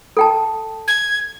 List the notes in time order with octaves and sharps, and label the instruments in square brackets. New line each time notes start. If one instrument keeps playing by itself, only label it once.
[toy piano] A4 G5 A5
[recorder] G#6